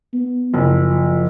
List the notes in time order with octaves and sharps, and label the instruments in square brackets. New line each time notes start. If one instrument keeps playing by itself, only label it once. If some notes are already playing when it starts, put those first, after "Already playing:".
[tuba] B3
[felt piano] F#1 [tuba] F3